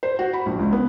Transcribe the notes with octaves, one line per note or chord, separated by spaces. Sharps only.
C5
F#4
B5
A#1
C#2
B3